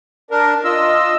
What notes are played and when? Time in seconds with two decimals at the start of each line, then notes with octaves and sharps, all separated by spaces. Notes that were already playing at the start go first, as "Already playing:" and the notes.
0.31 D4 A#4
0.65 F4 D#5 E6